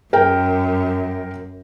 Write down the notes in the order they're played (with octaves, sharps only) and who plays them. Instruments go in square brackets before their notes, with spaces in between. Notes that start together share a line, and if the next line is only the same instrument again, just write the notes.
[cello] F#2 [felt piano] A#4 G5